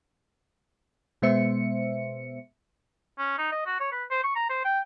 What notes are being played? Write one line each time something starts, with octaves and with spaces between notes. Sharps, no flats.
B2 G#3 B3 C5 E5 C#7
C#4
D#4
D#5
F#4
C#5
B4
C5
C#6
A#5
C5
G5